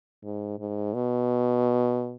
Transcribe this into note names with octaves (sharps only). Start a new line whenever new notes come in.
G#2
G#2
B2